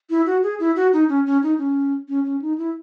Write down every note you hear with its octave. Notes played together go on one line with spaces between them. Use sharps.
E4
F#4
G#4
E4
F#4
D#4
C#4
C#4
D#4
C#4
C#4
C#4
D#4
E4